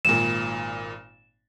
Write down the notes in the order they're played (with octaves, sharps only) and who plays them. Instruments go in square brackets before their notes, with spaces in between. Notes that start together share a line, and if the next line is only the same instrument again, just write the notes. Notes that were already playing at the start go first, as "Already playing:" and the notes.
[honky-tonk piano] G#1 A#2 [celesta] E7